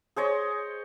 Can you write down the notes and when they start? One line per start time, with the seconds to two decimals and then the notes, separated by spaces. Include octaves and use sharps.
0.16 G#4 C5 C#5 D#5